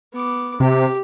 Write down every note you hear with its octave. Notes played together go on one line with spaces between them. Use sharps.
B3 D6
C3 G4